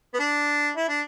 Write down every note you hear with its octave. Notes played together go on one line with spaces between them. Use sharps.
B3
D4
E4
D4